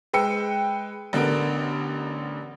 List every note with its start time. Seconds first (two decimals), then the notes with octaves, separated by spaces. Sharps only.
0.13 G#3 B4 G5 E6 C#7
1.13 A1 D3 B3 A#4 D7